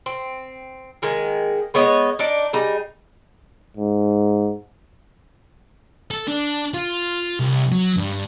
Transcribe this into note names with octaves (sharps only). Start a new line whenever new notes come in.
C4
D#3 G#3 A#3
G#3 B3 C#5 D#5
D4 D#4 D5
G3 D#4 G#4
G#2
A4
D4
F4
C2
F#3
G2